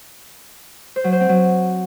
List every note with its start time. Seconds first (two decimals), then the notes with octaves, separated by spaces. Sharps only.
0.96 C5
1.04 F#3
1.12 C5
1.21 C4
1.29 F#3